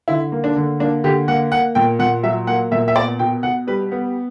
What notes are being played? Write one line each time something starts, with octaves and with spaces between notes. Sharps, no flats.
D3 E4
A#3
D4
D3
A#3 D4
D3 G4
A#3 F#5
A#3 F#5
A#2 G5
A#2 F#5
F#3 E5
A#3 F#5
A#2 E5
E5
B3 D5
B2 G5
B2 F#5
G3 B4
B3